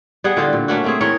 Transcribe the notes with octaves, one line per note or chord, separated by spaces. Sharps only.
G3 B3 G#4 F#5
D3 E4 F4 G4
A#2
A3 A#3 C#4 F#4
A3 C4 G#4
E3 G#4 A#4 C#5